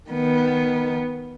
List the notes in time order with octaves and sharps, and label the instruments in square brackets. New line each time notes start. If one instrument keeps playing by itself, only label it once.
[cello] D#3 B3